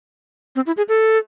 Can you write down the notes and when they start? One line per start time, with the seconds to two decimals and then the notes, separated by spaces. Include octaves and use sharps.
0.56 C4
0.67 E4
0.77 G#4
0.89 A4